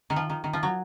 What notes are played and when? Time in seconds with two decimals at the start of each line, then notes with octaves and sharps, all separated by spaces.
0.10 D#3
0.16 F3
0.30 D#3
0.44 D#3
0.53 F3
0.63 F#3